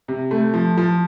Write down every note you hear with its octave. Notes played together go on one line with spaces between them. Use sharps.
C3
A3
F3
F3